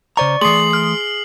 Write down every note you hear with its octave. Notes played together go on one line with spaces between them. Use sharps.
C#3 C5 D5 A#5 C#6
E3 A3 G#4 C6 D#6 C7 F#7
F6